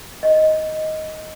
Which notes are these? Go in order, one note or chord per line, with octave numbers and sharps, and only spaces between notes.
D#5